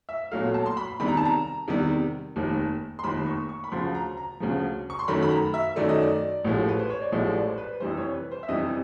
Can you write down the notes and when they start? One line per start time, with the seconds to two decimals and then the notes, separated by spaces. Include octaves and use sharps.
0.09 E5
0.32 B1 A#2 F#3 A3 F5
0.54 A5
0.66 C6
0.77 B5
1.00 E2 C3 D#3 G3 B5
1.08 A#5
1.17 A5
1.25 A#5
1.68 E2 C3 D#3 G3
2.36 F1 D#2 D#3
2.99 C6
3.04 F1 D#2 D#3 B5
3.26 C#6
3.49 C#6
3.64 B5
3.72 D2 C#3 F3 C6
3.95 A#5
4.17 A#5
4.40 D2 C#3 F3
4.90 C#6
4.99 C6
5.08 F#2 D#3 F#3 A3 B5
5.23 B5
5.31 A#5
5.54 E5
5.76 F#2 D#3 F#3 A3 D5
5.89 D#5
6.02 D5
6.44 A1 A2 F3 G#3
6.68 B4
6.79 C5
6.90 C#5
7.01 D5
7.12 A1 A2 F3 G#3 D#5
7.35 D5
7.50 C5
7.58 B4
7.80 F2 C3 E3 G3 C5
7.97 C#5
8.14 B4
8.31 C5
8.43 E5
8.49 F2 C3 E3 G3 D#5